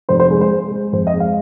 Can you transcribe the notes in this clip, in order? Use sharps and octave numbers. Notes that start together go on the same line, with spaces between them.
F1 C5
C5
G#3
C5
G#3
G#3
F2 C5
D#5
G#3
F5